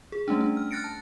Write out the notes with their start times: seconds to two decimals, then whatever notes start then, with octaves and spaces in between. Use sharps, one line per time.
0.12 G#4
0.28 G3 A3 C#4 D4
0.41 D4
0.57 F6
0.71 F6 F#6 A6 A#6 C#7 D7
0.84 A5